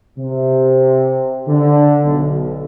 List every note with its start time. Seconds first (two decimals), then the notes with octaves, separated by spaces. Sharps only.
0.18 C3
1.48 D3
2.04 B1